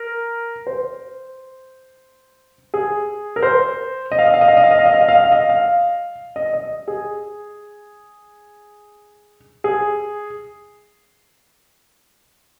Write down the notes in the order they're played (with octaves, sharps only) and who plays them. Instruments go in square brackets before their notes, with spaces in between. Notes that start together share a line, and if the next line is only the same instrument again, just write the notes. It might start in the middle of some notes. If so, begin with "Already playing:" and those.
Already playing: [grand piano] A#4
C5
G#4
A#4
C5
D#5
F5
D#5
F5
D#5
F5
D#5
F5
D#5
F5
D#5
F5
D#5
F5
D#5
F5
D#5
F5
D#5
D#5
G#4
G#4